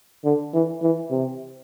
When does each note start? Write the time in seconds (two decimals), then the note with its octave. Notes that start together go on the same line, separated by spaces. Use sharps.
0.24 D3
0.53 E3
0.82 E3
1.11 C3